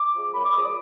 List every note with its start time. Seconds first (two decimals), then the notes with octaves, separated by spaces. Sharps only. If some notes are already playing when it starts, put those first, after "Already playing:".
Already playing: D6
0.13 F3 G#3
0.33 F#2 B5
0.43 D6
0.54 F3 G#3 D#6
0.63 D6